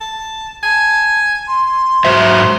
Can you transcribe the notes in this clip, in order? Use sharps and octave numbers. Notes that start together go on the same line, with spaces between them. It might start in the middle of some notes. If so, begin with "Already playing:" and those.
A5
G#5 A5
C6
G#2 F#3 C5 E5